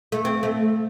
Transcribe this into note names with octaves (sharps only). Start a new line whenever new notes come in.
A3
C4
A3